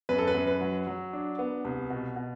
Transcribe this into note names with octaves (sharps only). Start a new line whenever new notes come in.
F#2 B4
A4
B4
F#2
B4
F#3
F#3
D4
B3
C2
B2
B2